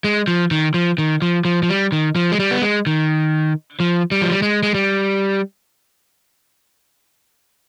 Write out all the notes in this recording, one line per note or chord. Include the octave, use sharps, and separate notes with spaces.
G#3
F3
D#3
F3
D#3
F3
F3
F3
G3
D#3
F3
G#3
G3
B3
G#3
D#3
F3
G3
F3
G3
G#3
G#3
G3